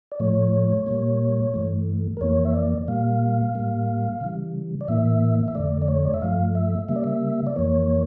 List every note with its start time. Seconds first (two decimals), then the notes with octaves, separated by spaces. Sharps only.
0.12 D5
0.20 A2 F3 A3 C#5
0.86 A#2 G3 A#3
1.54 G2 E3 A3
2.17 A#4
2.21 F2 E3 A#3 C#5
2.45 E5
2.54 D5
2.88 A#2 G3 A#3 F5
3.55 A2 G3 A#3
4.21 C#3 E3 G3
4.81 D5
4.88 A2 E3 A#3 E5
5.48 E5
5.55 F2 D3 A3 D5
5.82 D5
5.88 C#5
6.05 D5
6.14 E5
6.22 G2 F3 A3 F5
6.55 E5
6.89 C#3 G3 A#3 E5
6.96 D5
7.04 E5
7.47 D5
7.56 F2 E3 A#3 C#5